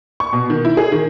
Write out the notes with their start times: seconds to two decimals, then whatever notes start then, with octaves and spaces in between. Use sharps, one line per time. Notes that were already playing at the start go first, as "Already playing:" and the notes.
0.20 C#6
0.33 B2
0.50 D#3
0.65 E4
0.77 G#4
0.92 D#3